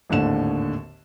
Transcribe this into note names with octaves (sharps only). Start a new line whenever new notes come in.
G#1 D#2 A2 D3 E7